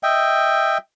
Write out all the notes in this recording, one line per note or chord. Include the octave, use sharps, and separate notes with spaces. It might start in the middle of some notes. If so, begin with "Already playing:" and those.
D#5 E5 G5